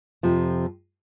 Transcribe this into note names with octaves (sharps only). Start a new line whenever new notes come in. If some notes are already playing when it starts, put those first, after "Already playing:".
F2 C3 F3